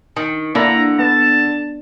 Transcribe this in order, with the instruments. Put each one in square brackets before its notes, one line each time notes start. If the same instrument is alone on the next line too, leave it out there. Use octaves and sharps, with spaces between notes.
[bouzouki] D#3
[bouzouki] D3 [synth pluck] A#3 D4 E4 [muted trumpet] A#5
[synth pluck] B3 [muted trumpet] A5